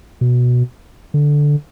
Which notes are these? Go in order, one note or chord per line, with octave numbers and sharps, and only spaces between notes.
B2
D3